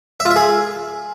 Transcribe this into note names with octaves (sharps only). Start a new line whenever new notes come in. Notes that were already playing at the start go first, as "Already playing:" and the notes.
E5
F4
E5
G#4